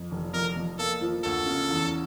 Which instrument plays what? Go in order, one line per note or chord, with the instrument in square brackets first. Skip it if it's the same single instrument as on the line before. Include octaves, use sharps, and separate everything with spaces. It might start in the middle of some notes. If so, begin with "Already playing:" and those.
Already playing: [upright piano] F2
F1
[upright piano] F2 [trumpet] A#4
[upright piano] F2
[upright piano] A#3 [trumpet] A4
[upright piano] F3
[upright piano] D2 [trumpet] A4
[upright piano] C#3
E2